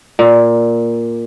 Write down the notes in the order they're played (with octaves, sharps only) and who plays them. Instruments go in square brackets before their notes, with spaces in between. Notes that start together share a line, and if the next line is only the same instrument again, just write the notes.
[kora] A#2